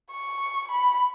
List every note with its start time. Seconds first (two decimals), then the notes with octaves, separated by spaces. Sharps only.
0.12 C#6
0.71 B5